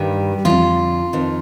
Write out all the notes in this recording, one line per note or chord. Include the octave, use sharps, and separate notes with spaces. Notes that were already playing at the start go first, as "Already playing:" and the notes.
Already playing: G2 D#3 G3 G4
F2 D3 F3 F4
F2 D#3